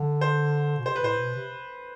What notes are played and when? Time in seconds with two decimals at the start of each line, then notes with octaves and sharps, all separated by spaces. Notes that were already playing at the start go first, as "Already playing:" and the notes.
Already playing: D3
0.21 C5
0.78 B2
0.86 C3 C5
0.96 B4
1.02 A2 C5
1.18 B2
1.35 C3